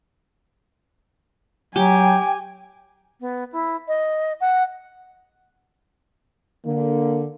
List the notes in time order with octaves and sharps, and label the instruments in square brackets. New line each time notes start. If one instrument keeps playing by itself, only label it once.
[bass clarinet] F#3 [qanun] G4 [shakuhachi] G5 [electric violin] G#5
[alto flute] B3
E4
D#5
F#5
[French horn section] D3 [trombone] A#3